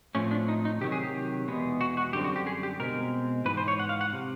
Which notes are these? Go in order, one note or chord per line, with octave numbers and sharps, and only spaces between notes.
A2 F3 A3 C4 C#4
D4
D#4
D#4
C3 D#3 F#3 G4
G#4
G4
E2 B2 G#3 B3
F#4
F#4
F#2 D3 G3 C4 G4
F#4
G4
G#4
G4
B2 G#3 C4 A#4
G#2 E3 B4
C5
C#5
F#5
F5
F#5
C3